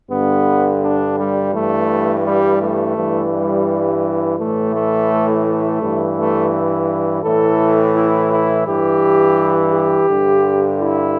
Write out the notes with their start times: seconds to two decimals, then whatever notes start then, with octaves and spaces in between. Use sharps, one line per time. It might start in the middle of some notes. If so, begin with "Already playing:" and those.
0.10 G2 D3 B3
0.82 D4
1.18 G3
1.53 G2 E3 A3
2.25 G3
2.61 A3
2.95 G2 E3
3.32 G3
4.38 A2 E3 A3
4.74 A3
5.46 A3
5.82 G2 E3
6.17 A3
7.24 A2 E3 A4
7.94 E4
8.31 E4
8.66 G2 E3 G4
9.73 G4
10.09 G2 D3
10.80 E4